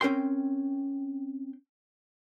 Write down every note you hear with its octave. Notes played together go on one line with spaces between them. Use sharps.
C4 C#4 A#4 G5 C6